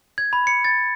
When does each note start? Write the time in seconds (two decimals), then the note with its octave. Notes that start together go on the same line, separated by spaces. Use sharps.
0.18 G#6
0.33 B5
0.47 C#7
0.65 A6